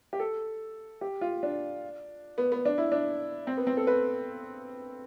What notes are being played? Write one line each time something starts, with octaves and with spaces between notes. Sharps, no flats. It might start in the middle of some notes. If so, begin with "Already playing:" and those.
G4
A4
G4
F4
D4
B3
B3
D4
E4
D4
C4
B3
C4
A4
B4